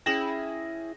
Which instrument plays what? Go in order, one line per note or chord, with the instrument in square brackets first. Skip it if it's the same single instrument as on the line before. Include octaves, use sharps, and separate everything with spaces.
[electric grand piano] C#4 G#4 G5 [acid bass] E4 [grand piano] A#6 E7 F#7